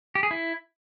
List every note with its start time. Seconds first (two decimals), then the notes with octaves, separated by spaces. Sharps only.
0.15 G4
0.23 G#4
0.31 E4